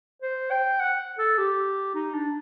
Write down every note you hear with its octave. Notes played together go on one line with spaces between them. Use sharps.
C5
G5
F#5
A4
G4
D#4
D4